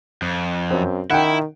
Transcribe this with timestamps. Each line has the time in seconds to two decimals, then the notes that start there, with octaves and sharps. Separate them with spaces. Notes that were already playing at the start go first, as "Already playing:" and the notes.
0.22 F2
0.71 F#2 C4
1.10 D#3 E4 F#5 G5